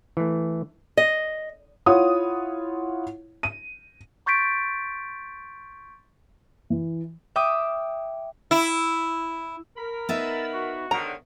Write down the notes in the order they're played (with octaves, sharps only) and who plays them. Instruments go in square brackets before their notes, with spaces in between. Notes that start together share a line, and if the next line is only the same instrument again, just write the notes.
[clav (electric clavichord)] E3 A3
[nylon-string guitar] D#5
[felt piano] E4 F4 C#5 F#5 D#6
D#7
[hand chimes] C6 C#6 G6 A6 B6 D7
[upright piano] E3
[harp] E5 G5 D6 D#6
[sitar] E4
[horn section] A#4 B5
[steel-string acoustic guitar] B3 D#4 E5 [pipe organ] E6 A6
[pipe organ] F#4
[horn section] G#2 D3 D#3 [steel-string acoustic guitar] C#5 [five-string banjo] A#5